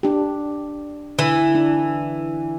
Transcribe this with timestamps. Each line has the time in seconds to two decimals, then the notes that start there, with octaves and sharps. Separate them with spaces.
0.03 D4 G4
1.19 D3 E3
1.55 D4